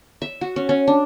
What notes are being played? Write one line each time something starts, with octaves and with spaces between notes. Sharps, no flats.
E5
F#4
C#4
C#4
D4